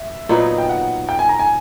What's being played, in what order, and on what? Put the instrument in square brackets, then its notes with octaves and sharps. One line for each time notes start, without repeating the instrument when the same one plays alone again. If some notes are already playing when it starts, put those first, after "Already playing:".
Already playing: [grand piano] E5
[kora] A#2 F#3 B3 D#4
[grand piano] G5
F#5
G5
G#5
A#5
G#5